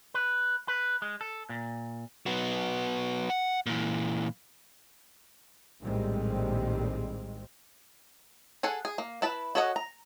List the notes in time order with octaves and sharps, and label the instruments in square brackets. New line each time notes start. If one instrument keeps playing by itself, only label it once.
[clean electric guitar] B4
B4
G#3
A4
A#2
[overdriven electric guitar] F#3 B3
F#5
A#2 E3
[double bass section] A#1 A2 D#3 G3 G#3 C4
[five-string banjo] G#4 A4 F#5 G#5
G#4
A#3
E4 B4 A5 B5
F#4 A4 C#5 D#5 F#5
A#5